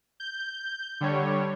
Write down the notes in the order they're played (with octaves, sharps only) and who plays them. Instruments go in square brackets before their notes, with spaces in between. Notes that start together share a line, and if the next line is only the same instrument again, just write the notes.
[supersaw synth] G6
D3 G3 C#5